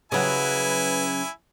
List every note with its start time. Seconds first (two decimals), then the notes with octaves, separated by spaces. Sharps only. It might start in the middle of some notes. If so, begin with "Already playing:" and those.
0.12 C#3 F#3 E4 B4 G#5